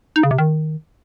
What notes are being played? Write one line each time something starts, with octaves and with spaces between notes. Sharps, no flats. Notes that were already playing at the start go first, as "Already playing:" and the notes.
D#4
C#3
C3
D#3